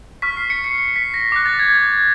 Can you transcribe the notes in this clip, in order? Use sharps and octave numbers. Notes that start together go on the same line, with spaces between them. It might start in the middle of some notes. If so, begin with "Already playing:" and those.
C#6 F6 B6
C7
C#7
C#7
C#7
B6
A#6
D6 F#6 A#6
A6
G#6
G#6